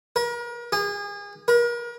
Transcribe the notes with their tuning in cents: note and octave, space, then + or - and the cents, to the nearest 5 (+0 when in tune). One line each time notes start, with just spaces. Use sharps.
A#4 +40
G#4 -35
A#4 +40